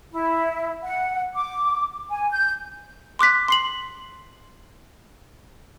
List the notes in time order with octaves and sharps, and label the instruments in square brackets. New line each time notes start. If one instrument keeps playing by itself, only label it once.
[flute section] E4
F#5
D6
G#5
G6
[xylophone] C6 D6 F#6 B6
C6 C7 F#7